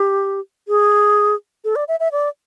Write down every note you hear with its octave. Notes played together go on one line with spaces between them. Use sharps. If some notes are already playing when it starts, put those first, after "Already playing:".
Already playing: G4
G#4
A4
D5
E5
E5
D5